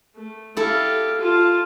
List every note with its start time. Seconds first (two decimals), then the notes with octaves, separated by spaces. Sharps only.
0.16 A3
0.57 E4 G4 A4 F5
1.21 F4 A5